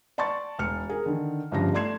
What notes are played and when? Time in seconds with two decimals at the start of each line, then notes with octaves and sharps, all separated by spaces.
0.18 D5 A5 C6 C#6 A6
0.59 E1 F6 C#7
0.89 G#4 A#4
1.06 D3 D#3
1.52 G1 G2 C#3 F3 F4 A#6
1.74 A3 D5 C6 G#6 C7 E7